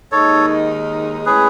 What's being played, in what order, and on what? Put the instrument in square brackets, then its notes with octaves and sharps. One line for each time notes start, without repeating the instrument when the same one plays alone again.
[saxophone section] D#2 D#3 G#3 D#4 [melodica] A4 C#5
[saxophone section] A2 G#3 C#4 [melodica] G#4 B4